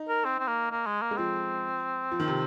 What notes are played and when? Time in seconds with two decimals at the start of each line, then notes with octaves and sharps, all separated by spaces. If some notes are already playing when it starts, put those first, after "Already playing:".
Already playing: D#4
0.08 A#4
0.25 C4
0.39 C4
0.48 A#3
0.71 A#3
0.87 G#3
1.02 A#3
1.11 G#3
1.17 F3 C4
2.11 F3
2.20 D#3
2.28 C3